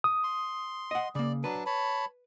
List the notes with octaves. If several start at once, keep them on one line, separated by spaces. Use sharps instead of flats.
D#6
C6
D#5 F#5
C#3 A#3 D5
F#3 D4 B4 A5
C#5 A5 B5